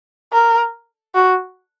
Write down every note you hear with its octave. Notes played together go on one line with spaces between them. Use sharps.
A#4
F#4